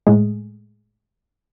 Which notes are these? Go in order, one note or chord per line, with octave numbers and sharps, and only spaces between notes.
A2 G#3